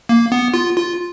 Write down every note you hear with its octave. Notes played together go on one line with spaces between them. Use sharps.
A#3
B3
F4
F4